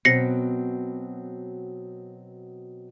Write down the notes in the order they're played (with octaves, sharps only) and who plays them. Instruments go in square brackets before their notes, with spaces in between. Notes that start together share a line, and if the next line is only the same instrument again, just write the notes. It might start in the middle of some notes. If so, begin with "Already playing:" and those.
[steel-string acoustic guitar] B2 F#3 C4 [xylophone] A#6 C7 C#7